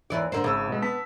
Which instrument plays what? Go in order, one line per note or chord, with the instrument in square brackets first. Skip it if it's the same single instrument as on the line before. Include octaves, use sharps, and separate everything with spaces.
[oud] D#2 E3 D5
D3 A#3 C5
[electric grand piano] G#1 E6 [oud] C#3
[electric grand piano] B2 G#3
B3 A5 B6